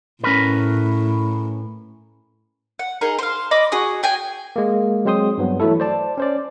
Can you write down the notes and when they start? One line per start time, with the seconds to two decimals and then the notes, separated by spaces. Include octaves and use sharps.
0.24 A2 C#4 A#4 B4
2.79 F#5
3.01 D#4 G#4 A#4
3.19 C5 F5
3.51 D#5 B5 D6
3.72 F#4 G#4 D#6
4.03 G#4 G5 G#5
4.56 G#3 A#3
5.05 F#3 G#3 C4 C5 C6 D#6
5.38 G2 F#3 B3
5.60 E3 F#3 A3 E4 A4
5.80 C5 D5 A5
6.18 C#4 C5 D5